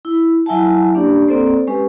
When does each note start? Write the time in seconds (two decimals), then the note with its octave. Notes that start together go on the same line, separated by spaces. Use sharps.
0.05 E4
0.46 F#3 E4 E5 F#5 G#5 A5
0.94 A#3 C#4 D4 G4 D5
1.28 A#3 C4 A4 C5 D5
1.67 G#3 C#4 G4 B4